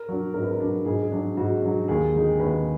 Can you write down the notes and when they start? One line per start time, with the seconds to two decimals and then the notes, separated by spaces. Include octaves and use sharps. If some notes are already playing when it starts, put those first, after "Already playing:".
Already playing: A#4
0.09 F#3 D4
0.34 G#2 A#4
0.43 B4
0.51 A#4
0.60 F#3 D4
0.85 G#2 G#4
1.03 G#4
1.12 F#3 D4
1.37 G#2 F#4
1.63 F#3 D4
1.88 D#2 G#4
2.15 D3 G#3 D#4
2.40 D#2 B4